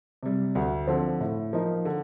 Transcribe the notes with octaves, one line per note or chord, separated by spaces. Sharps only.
C3 G3
D2
D3 F3 C4
A2
F3 A#3 D#4
D3